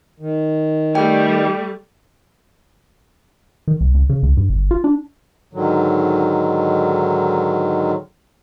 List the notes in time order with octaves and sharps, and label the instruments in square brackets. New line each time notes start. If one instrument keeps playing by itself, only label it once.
[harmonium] D#3
[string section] G3 A3 [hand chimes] G5
[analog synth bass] D#3
C2
C#2
C#3
C#2
G2
G1
F4
D4
[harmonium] G#2 D3 D#3 F#3